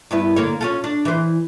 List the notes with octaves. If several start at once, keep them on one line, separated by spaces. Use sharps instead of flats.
G2 B3 E4
D3 A#3 C#5
C#4 F4 A4
D4
E3 C5